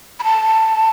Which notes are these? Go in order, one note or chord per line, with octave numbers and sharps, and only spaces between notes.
B5
A5